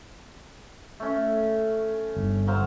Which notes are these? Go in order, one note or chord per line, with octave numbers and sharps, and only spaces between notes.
A3 C#4
G1
F#3 C5 F5